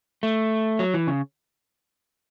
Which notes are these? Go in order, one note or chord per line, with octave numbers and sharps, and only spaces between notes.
A3
F#3
E3
C#3